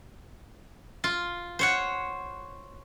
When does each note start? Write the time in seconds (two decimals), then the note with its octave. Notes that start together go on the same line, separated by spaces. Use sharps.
1.04 F4
1.59 C5 C#5 F#5